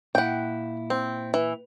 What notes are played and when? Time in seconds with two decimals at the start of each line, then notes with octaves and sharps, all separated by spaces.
0.15 A#2 E4 F#5 G5
0.90 C4
1.34 E3